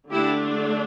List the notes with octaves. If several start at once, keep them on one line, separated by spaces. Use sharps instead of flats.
D3 A3 D4 E4 G4